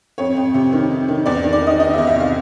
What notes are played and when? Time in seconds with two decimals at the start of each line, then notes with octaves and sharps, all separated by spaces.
0.18 F2 C#5
0.37 F2
0.54 C3
0.73 D#3
0.91 F2
1.08 D#3
1.26 E2 D5
1.44 D#3
1.53 D5
1.62 D#3 D#5
1.80 D#3 D#5
1.93 E2 E5
2.07 E5
2.16 C3 F5